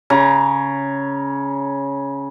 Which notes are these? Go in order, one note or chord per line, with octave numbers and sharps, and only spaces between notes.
C#3 A#5